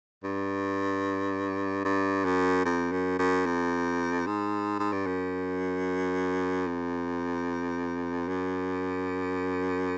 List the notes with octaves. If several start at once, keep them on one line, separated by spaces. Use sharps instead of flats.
G2
G2
F#2
F2
F#2
F#2
F2
G#2
G#2
G2
F#2
F2
F#2